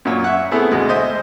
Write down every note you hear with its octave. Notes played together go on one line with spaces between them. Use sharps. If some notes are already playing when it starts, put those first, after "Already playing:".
F#2 A#2 C#5
E5 F#5
A3 B3 C4 E4 G#4 A4
D2 B2 G#3
C5 D#5 E5